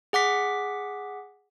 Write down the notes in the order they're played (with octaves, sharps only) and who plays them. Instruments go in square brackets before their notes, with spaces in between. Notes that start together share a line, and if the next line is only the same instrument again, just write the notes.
[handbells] G#4 F#5 D6 B6